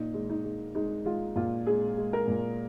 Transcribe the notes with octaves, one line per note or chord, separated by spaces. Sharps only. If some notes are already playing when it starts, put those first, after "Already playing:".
Already playing: A#2 D#4
G#3
D#4
G#3
G#3 D#4
G#3 F4
A#2 F4
G#3 G#4
G#3
A#4
A#2